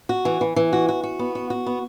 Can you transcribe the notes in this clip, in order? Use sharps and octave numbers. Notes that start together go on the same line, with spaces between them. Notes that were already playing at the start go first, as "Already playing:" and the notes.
F#4
E3
E3
E3
F#4
F#4
F#4
B3
F#4
F#4
B3